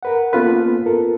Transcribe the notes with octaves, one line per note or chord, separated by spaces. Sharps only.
A#4 B4 F#5
A#3 B3 C#4 F4 A4 B4
F4 A4 A#4